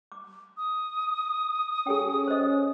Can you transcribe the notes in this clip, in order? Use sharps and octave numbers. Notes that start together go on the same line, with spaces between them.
D6
D#6
C#4 G#4 A4 G5
C5 D#5